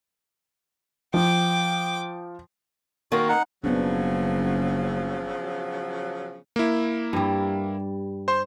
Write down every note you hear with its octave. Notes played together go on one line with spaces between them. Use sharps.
F3 G5 D6
D#3 A#3 C4 F#4
D#4 F#5
F#1 C#3 F3 F#3 B3 D4
A#3 E4
G2 G3
C5 C6